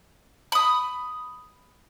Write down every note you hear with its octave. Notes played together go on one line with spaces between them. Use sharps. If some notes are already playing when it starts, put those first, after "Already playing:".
B5 D#6